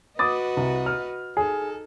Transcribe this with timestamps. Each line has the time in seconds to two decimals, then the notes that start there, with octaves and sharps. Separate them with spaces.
0.19 F#4 B4 D#5 D6 D#6 A6
0.57 C2
0.86 F6
1.37 D#4 G#4 A4